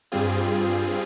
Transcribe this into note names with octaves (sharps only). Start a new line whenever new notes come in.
G2 G3 C4 F4 G#4